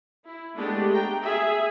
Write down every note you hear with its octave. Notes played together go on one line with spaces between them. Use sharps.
E4
G#3 A3 B3 D4 G4
G5 A#5
G#4 E5